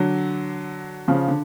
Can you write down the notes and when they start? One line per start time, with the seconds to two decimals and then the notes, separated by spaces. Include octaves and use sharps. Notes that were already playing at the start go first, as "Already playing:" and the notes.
Already playing: D3 F#3
1.08 C#3 F3
1.28 D3